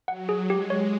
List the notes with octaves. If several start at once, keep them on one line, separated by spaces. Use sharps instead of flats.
F#3 F#5
G#4
G#3 G4
C#5